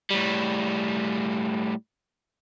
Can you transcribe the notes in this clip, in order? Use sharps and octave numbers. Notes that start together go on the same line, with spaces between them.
A2 G3